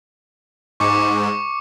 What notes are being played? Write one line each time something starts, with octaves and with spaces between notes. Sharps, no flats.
G#2 C#6 D6 C#7